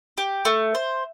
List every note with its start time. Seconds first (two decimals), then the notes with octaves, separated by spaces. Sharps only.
0.18 G4
0.45 A3
0.75 C5